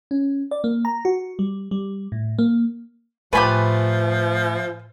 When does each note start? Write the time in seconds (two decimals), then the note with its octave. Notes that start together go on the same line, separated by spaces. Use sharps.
0.11 C#4
0.51 D5
0.64 A#3
0.85 A#5
1.05 F#4
1.39 G3
1.71 G3
2.12 A2
2.39 A#3
3.33 A2 F3 A3 F4 G4 B4 G#5 B5